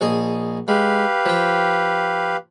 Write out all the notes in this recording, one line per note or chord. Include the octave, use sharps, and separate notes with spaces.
A#1 G#4 D#5
G#3 G4 B4 F5
F3 G5